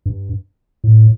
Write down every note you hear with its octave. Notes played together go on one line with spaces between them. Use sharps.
G2
A2